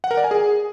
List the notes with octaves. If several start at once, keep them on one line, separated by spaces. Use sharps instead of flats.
F#5
A#4
D5
G#5
G#4